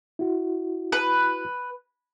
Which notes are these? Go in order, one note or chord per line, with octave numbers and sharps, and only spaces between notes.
E4 F#4
B4